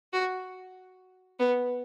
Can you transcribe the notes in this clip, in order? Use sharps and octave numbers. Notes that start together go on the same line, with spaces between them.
F#4
B3